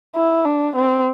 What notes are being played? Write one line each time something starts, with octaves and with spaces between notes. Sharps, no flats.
E4
D4
C4